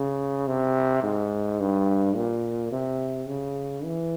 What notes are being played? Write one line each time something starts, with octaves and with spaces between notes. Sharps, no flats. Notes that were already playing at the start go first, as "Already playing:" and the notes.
Already playing: C#3
C3
G#2
G2
A#2
C3
C#3
E3